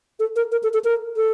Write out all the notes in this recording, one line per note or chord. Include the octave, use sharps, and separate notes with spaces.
A4
A#4
A#4
A4
A4
A#4
A4